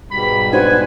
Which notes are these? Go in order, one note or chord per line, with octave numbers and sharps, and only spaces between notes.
G#2 B2 G3 B5
D#4 F#4 B4 C5 G#5